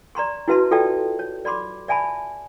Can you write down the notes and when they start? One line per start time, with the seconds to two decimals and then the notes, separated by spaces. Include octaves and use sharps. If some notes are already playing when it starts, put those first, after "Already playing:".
0.15 D5 A#5 C6 C#6
0.48 E4 F#4 B4 E5 A5 C6
0.71 F4 A4 D5 E5 G5 A5
1.19 C#5
1.45 D5 B5 C6 D6
1.88 D5 E5 G#5 A5 B5